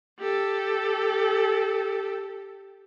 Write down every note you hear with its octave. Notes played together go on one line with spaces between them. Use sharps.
G4 A4